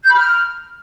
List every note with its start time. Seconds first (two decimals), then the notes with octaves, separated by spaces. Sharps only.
0.03 G6
0.09 B5
0.15 F6